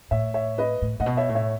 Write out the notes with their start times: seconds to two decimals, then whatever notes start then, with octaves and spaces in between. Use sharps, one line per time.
0.11 A2 C#5 E5
0.34 C#5 E5
0.58 B4 D#5
0.82 A2
1.00 A2 D#5 F#5
1.06 B2
1.17 C#5 E5
1.29 A2
1.35 C#5 E5